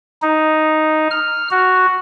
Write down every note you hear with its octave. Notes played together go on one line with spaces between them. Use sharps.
D#4
F6
F#4